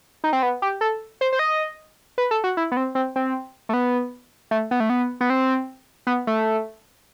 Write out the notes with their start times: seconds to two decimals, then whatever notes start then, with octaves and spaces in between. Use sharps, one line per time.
0.24 D#4
0.33 C4
0.43 B3
0.62 G4
0.81 A4
1.21 C5
1.32 C5
1.39 D#5
2.18 B4
2.31 A4
2.44 F#4
2.57 E4
2.72 B3
2.77 C4
2.95 C4
3.16 C4
3.69 A3
3.73 B3
4.51 A3
4.71 B3
4.80 A3
4.90 B3
5.21 B3
5.30 C4
6.07 B3
6.27 A3